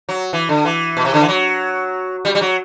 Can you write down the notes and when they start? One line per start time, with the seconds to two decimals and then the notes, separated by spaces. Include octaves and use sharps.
0.09 F#3
0.33 E3
0.49 D3
0.65 E3
0.97 B2
1.05 C3
1.14 D3
1.21 E3
1.29 F#3
2.25 G3
2.35 G3
2.41 F#3